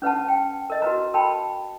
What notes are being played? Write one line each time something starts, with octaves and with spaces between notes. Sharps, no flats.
C#4 B4 F#5 A5
G5
A#4 D#5
F#4 A#4 B4 A#5
A#4 G5 A5 B5